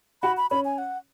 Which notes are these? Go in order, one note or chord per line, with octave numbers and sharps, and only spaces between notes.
F#4 B5
B5
C#4 B5
G#5
F#5